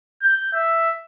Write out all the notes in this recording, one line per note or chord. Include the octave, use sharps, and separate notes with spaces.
G6
E5